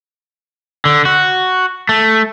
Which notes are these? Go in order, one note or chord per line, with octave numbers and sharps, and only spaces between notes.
D3
F#4
A3